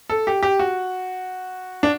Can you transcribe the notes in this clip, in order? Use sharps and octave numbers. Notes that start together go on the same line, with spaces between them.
A4
G4
G4
F#4
D4